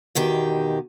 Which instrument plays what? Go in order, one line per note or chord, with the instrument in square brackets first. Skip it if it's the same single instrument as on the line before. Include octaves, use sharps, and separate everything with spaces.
[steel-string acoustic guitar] E2 B2 D#3 G4